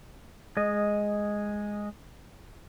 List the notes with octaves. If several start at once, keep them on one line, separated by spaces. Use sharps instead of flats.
G#3 D#5